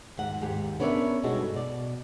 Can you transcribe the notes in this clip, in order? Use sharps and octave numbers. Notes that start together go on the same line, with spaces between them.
D#2 G#2 F#5
D#2 G#2 G4
B3 C#4 D4 A#4 C#5 E5
G2 B2 G#3 D#4 F#4 A4
B2 D5